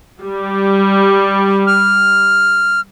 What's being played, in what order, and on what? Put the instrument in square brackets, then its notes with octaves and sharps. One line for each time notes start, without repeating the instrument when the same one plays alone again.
[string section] G3
[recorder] F6